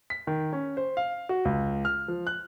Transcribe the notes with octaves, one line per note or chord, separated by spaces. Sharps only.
B6
D#3
C#4
C5
F5
F#4
C#2
F6
F3
F#6